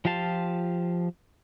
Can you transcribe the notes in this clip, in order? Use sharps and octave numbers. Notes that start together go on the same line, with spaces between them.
F3 F4 G4 F5 A5